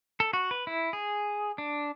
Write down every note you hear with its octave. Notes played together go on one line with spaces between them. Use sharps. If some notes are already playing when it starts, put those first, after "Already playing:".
A4
F#4
B4
E4
G#4
D4